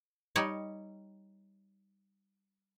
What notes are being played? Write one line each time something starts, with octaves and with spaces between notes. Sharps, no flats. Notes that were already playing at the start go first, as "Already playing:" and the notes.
G3 D#4 C#5